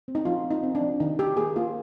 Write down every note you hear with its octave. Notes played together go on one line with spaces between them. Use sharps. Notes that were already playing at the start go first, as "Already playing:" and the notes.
C4
D#4
F3 F4
C4
D#4
C4
D4
F3
D#3 D#4
D#3 G4
A#3 G#4
A#3 F4